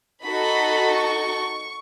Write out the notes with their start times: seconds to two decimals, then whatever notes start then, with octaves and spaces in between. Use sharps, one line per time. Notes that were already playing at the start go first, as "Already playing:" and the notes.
0.24 D#4 F#4 A4 B5
0.95 C#6